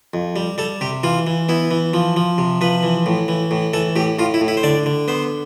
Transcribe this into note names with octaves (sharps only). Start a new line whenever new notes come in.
F2
G3
G3 A4
C3 G4
E3 F4
E3
B3 E4
E3
F3
F3
C3
F3 B4
E3
A2
E3
A2
E3 A4
A2 G4
A2 F4
E4
A2
E4
C5
D3 D5
D3
B3 C5